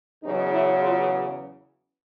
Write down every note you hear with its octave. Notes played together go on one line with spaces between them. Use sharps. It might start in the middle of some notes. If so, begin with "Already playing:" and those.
E2 C#3 F#3 D#4
E4
F4